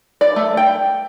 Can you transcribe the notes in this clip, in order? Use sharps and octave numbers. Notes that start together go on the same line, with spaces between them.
D5
A3
G5